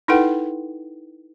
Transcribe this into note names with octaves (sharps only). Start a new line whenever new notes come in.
D#4 E4 A4 B4 F#5 G5